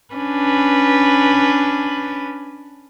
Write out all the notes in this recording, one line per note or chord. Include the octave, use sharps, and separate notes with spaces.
C#4 D4 B4